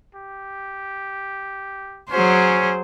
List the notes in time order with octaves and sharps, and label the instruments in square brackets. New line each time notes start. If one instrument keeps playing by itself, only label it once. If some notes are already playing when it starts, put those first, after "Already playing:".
[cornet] G4
[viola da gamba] F#3 G#4 C5 [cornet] C#4